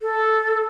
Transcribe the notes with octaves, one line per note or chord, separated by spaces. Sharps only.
A4